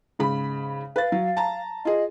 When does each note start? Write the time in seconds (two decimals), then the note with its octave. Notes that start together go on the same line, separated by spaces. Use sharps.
0.19 G#2 C#3 B5
0.96 B4 F5 A6
1.12 F#3
1.37 A5 A#5
1.85 F4 G#4 D#5